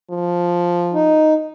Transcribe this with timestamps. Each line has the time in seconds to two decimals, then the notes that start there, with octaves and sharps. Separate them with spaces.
0.10 F3
0.93 D#4